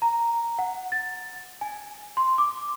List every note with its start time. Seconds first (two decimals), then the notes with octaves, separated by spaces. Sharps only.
0.02 A#5
0.59 F#5
0.92 A6
1.61 G#5
2.17 C6
2.38 D6